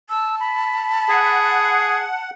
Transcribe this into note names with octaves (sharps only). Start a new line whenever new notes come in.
A5 E6
B5
G#4 F#5